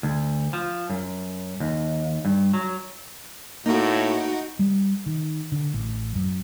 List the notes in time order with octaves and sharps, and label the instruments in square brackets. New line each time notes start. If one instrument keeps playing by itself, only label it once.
[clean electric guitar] D2
F3
F#2
D#2
G2
F#3
[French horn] A2 [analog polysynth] A#3 A#5 D7 [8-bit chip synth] D#4 F#4
[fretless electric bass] G3
D#3
D3
A1
F#2